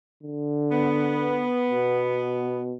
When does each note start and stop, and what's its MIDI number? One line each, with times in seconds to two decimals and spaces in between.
0.23 1.53 50
0.71 2.62 59
1.70 2.75 47